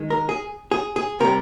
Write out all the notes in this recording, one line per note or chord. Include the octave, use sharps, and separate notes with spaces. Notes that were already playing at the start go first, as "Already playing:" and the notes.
Already playing: D#3 G#3
A#4
G#4
G#4
G#4
C3 G3 A#4